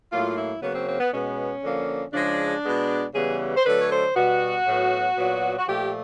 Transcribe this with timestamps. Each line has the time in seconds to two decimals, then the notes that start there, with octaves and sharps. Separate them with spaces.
0.11 A2 F#3 A#3 F4
0.37 E4
0.62 C#3 F#3 A#3 B3
0.74 C4
0.88 C4
1.00 B3
1.13 B2 G#3 B3 C#4
1.64 D3 F3 A#3
2.13 C#3 F3 G#3 D4
2.64 B2 G#3 B3
3.14 C#3 E3 G3 B3 G#4
3.57 C5
3.65 D3 F#3 A3 B4
3.81 C#5
3.91 C5
4.16 B2 G3 B3 F#4
4.66 A2 F#3 B3
5.17 A#2 F#3 B3
5.58 F#4
5.67 A#2 F3 A3 G4